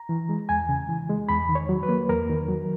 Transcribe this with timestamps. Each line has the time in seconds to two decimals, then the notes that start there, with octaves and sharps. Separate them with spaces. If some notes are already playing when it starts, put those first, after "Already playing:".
Already playing: A#5
0.09 E3
0.29 G#3
0.49 E2 G#5
0.69 C#3
0.89 E3
1.09 G#3
1.29 E2 B5
1.49 D#3
1.55 C#5
1.69 F#3
1.83 B4
1.89 A#3
2.09 E2 A#4
2.29 D#3
2.48 F#3